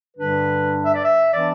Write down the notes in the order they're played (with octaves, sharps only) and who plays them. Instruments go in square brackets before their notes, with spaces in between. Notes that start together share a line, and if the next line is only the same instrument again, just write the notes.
[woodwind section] G2 D3 G3 D4 B4
E5
D5
E5
E3 B3 D4 D5